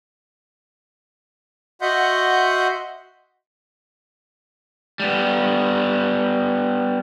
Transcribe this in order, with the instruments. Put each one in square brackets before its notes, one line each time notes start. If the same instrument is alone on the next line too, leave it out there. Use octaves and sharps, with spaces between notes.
[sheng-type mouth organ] F#4 D#5 E5 F#5 C6 G6
[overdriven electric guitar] G3 B3